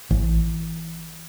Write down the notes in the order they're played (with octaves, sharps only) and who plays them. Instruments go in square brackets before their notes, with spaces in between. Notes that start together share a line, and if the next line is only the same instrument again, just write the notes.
[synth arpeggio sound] A1 [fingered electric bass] E3